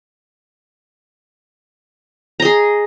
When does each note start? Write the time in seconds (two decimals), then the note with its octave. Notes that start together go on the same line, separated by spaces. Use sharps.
2.40 A#5
2.42 D#5
2.45 G#4